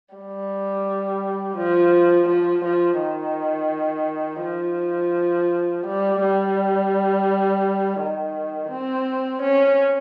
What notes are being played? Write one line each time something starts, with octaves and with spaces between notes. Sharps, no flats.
G3
F3
F3
F3
D#3
F3
G3
G3
D#3
C4
C#4